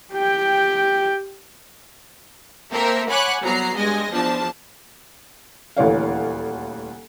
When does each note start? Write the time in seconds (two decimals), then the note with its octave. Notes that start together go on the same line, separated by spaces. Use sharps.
0.13 G4 G5
2.72 A#3 C4 A4 A#4 E5
3.09 C#5 F#5 G#5 B5 D6 F#6
3.41 C2 F#3 B3 A#5 C7
3.76 G2 G#3 D#5 G#5 A#6
4.10 E2 F3 D4 A5
5.77 D#1 D2 E3 C#5 F5